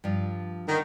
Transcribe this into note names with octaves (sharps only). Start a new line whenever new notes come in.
G2 F3
D3 D#3